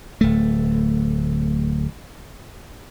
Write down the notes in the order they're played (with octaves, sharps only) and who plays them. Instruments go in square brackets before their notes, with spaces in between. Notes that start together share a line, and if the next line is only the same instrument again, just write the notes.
[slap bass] D1 A3